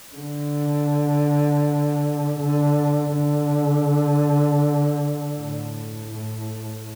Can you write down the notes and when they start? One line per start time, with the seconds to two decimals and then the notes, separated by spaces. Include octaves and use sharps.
0.16 D3
2.39 D3
3.14 D3
5.36 A2
6.11 A2